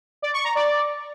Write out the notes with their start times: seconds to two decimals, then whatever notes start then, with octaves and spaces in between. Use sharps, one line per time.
0.22 D5
0.33 C#6
0.44 A#5
0.55 D5